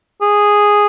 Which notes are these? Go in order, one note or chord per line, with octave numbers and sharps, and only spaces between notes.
G#4